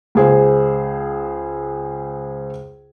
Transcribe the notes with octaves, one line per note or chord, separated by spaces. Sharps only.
C#2 G#4 C5